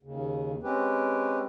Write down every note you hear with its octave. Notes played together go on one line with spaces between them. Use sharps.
D#2 C#3
G#3 C4 C#4 G4 B4